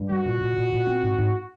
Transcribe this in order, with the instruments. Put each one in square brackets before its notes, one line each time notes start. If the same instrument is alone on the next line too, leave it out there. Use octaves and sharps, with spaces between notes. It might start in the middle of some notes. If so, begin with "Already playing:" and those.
Already playing: [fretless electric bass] G2
[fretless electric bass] G3 [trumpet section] F#4
[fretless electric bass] A#2
A#2
A#2
A#2
C4
G#2
G#2